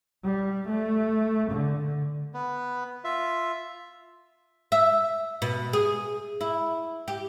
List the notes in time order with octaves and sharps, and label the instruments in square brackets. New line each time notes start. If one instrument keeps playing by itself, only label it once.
[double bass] G3
A3
D3
[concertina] B3
F4 E5
[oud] E5
B2
G#4
E4
G4